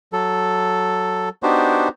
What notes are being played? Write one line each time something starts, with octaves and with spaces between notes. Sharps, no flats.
F#3 A4
B3 D4 D#4 F#4 G4 C5